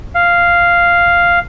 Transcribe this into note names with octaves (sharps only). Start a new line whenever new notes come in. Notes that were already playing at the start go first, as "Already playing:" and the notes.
F5